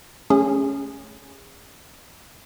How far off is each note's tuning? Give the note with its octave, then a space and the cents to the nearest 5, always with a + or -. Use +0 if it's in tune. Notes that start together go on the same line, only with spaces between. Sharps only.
A3 +0 C#4 +0 G#4 -35